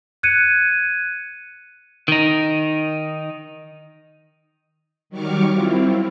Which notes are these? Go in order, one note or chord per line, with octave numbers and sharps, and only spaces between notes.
F#6 G#6 C#7 D#7
D#3 D#4
D#3 F#3 G3 C#6 D6 F6
C4 E4 F4